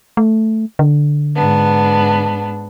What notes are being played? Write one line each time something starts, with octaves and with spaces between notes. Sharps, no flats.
A3
D3
G#2 B3 D4